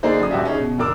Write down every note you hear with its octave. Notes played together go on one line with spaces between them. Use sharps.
D3 A#3 D4 D#4 G#4 C5
C#3 F#3 D#6
D#1 G2 F#4 G4 D5 E5
C#4 D#4 G#4
B2
F1 D3 A#4 D6 E6